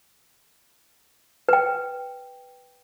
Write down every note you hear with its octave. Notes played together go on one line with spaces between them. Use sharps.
B4 G5